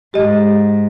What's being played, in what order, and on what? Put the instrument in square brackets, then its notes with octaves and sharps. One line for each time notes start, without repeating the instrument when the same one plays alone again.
[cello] G#2 [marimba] G4 D#5